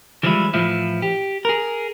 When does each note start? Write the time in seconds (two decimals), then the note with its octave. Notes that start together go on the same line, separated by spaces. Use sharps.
0.23 E3 F3 G3 G#3 E4
0.54 A2 E3 F3 E4
1.02 G4
1.45 G#4 A#4